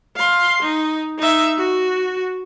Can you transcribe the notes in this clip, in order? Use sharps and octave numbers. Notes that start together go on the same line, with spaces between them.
F5 C6
D#4
D#4 E5
F#4